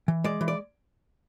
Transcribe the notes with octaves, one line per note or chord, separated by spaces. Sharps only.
E3
G#3 D5
E3
D5